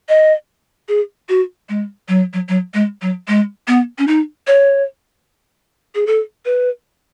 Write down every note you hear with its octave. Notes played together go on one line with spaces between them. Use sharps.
D#5
G#4
F#4
G#3
F#3
F#3
F#3
G#3
F#3
G#3
B3
C#4
D#4
C#5
G#4
A4
B4